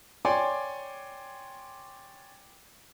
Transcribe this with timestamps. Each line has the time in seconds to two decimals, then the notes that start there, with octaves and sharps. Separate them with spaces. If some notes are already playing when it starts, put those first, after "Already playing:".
0.25 C#5 D5 G5 G#5 C6 D6